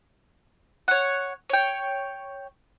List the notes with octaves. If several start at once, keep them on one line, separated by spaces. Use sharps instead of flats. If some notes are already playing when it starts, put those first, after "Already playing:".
C#5 F#5
C#5 G5